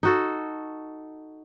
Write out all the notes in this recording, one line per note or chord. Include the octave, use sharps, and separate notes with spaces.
D#4 F#4 A4